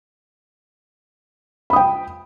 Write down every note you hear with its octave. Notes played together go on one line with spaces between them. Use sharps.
G5 B5 D#6